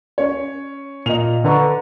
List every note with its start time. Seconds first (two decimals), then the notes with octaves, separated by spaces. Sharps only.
0.18 C#4 C#5
1.06 A#2 D#5 F7
1.44 D3 B4 A#5 C#6